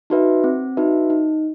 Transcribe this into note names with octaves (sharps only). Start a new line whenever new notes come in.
D#4 F#4 B4 E5
C4
D#4 F#4 B4 E5
D#4